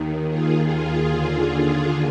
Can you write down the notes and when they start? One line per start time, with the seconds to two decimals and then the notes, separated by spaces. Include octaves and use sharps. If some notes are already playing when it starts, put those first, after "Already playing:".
Already playing: D#2 D#3
0.28 F4 G#4
0.64 F4 G#4
1.01 D#2 D3